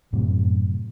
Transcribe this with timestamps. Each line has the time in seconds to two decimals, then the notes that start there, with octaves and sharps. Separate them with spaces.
0.13 F#2 A2 C3